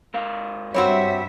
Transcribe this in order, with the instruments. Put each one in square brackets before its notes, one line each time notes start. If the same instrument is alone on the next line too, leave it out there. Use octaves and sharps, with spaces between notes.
[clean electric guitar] G#2 A#4 F5
[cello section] G2 E5 [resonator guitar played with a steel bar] G3 C4 F#4 [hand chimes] C#5 C6